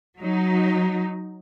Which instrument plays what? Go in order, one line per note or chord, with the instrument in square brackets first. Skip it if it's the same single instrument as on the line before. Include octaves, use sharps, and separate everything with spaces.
[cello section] F#3 D#4